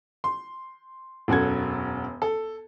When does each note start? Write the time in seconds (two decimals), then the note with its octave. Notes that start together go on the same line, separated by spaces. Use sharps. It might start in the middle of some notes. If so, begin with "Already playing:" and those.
0.24 C6
1.28 E1 F#2 F#4 A4 G#6
2.22 A4